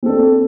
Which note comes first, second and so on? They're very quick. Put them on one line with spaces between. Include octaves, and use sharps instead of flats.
C4 A4 D4